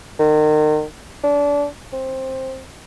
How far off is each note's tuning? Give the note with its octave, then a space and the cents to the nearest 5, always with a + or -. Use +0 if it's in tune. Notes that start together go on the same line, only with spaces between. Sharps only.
D#3 -35
D4 -30
C4 +10